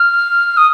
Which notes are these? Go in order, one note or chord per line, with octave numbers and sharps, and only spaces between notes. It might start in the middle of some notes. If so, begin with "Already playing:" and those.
Already playing: F6
D#6